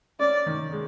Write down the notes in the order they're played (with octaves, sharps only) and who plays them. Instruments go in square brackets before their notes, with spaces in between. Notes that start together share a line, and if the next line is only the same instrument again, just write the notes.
[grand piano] C#4 [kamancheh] D5
[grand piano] D#3
G#3